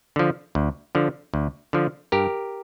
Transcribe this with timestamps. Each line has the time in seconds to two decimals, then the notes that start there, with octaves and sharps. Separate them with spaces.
0.16 D3 F3
0.55 D2
0.95 D3 F3
1.34 D2
1.73 D3 F3
2.12 G2 G4 A#4